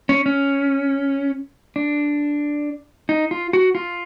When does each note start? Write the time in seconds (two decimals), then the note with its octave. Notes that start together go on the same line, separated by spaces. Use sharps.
0.09 C#4
0.26 C#4
1.76 D4
3.09 D#4
3.31 F4
3.53 F#4
3.75 F4